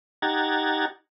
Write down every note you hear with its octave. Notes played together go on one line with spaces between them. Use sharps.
D#4 G4 F#5 A#5 G#6 A6